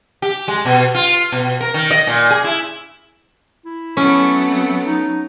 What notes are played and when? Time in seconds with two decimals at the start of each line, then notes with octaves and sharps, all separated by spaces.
0.22 G4
0.48 G#3
0.65 B2
0.94 F4
1.32 B2
1.61 A#4
1.74 D#3
1.91 D#5
2.07 A#2
2.30 G#4
2.44 E4
3.65 E4
3.97 F#3 A3 B3 C#4
4.49 C4
4.85 D#4